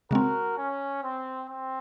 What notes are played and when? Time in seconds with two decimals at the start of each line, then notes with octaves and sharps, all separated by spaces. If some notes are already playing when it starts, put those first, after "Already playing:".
0.11 C#3 G#3 C4 F#4 A#4
0.57 C#4
1.03 C4
1.49 C4